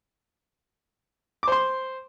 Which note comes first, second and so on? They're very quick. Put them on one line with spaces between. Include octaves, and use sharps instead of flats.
D6 C5 C6